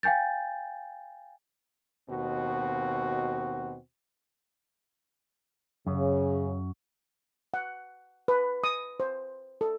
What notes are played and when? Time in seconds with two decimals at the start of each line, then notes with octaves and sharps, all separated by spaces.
0.03 F5 G5 G#5 G6 A6
2.09 D#2 B2 C4 F#4
5.87 F#2 C#3
7.54 F#5
8.28 B4
8.64 D#6
9.00 C5
9.61 A4